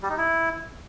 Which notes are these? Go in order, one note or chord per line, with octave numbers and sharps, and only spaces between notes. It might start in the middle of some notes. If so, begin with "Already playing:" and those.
G3
D#4
E4